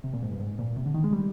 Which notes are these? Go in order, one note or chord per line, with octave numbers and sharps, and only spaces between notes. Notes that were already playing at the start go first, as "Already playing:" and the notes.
C3
A#2
G#2
G2
G#2
A#2
C3
D3
D#3
G#3
G3